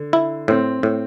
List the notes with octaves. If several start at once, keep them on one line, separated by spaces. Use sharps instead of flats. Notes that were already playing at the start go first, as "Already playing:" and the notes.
Already playing: D3
E4
A2 C4
A2